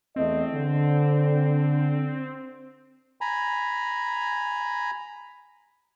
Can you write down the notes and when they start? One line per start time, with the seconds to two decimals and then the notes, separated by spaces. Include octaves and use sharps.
0.16 E2 A3 C4 D#5
0.53 D3
3.21 G#5 A#5 B5